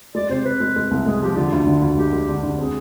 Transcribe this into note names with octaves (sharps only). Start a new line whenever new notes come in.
G#3 D5
C3 C5
C3 B4
G#3
G#3
C2
G#3 G#4
F3 G4
D3 F4
D2
D3
D2
G#3 G4
G#3
D3
D3
C4 G#4